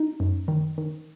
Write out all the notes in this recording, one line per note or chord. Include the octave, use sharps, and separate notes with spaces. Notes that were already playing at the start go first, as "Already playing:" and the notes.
Already playing: D#4
F#2
D#3
D#3